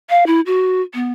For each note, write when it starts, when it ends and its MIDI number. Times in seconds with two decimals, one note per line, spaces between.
0.10 0.26 77
0.26 0.40 64
0.46 0.81 66
0.94 1.12 59